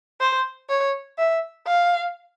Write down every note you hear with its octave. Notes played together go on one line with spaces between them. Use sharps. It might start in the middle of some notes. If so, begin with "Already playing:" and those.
C5
C#5
E5
F5